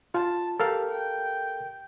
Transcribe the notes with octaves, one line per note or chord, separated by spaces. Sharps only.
F4 A5
G4 A4 A#4 F5
G5